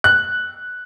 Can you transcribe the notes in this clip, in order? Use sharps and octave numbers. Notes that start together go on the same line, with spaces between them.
F#6